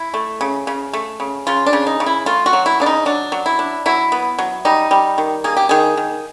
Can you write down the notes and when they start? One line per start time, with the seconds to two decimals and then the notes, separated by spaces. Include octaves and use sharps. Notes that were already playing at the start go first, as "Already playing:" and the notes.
Already playing: E4
0.14 A3
0.41 C#3
0.67 C#3
0.93 A3
1.20 C#3
1.47 C#3 F4
1.66 D4
1.73 C#3
1.87 D#4
2.00 C#3
2.06 E4
2.26 A3 F4
2.46 F#4
2.53 F#3
2.66 E4
2.80 C#3 D4
2.86 D#4
3.06 F#3 D4
3.32 F#3
3.46 E4
3.59 D4
3.86 F#3 E4
4.12 B3
4.39 F#3
4.65 G3 D#4
4.91 G3
5.18 D#3
5.44 A#3 G#4
5.57 G4
5.69 D#3 G#4
5.97 D#3